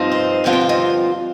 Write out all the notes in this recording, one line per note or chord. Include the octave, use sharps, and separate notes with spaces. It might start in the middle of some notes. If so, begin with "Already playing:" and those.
Already playing: G2 F3 C4 D#4
C5
G2 D3 F3 C4 F4 D5
G5
F5
D#5